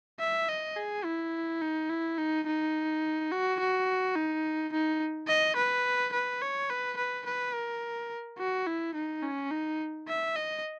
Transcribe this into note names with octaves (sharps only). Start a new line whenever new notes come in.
E5
D#5
G#4
E4
D#4
E4
D#4
D#4
F#4
F#4
D#4
D#4
D#5
B4
B4
C#5
B4
B4
B4
A#4
F#4
E4
D#4
C#4
D#4
E5
D#5